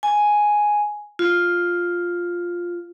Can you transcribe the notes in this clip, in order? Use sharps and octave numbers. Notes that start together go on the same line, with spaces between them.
G#5
F4